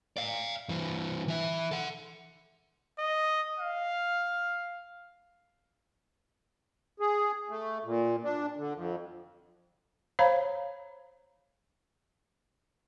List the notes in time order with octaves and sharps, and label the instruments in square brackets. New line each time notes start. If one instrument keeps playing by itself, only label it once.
[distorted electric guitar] D5 F5
G2 E3
E3 E5
A4 F#5
[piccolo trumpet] D#5
F5
[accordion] G#4
A3
A#2
D4
D3
F2
[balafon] C5 C#5 F5 A#5 B5